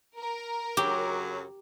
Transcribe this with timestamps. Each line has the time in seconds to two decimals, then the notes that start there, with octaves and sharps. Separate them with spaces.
0.19 A#4
0.77 F#2 C#3 F#3 G4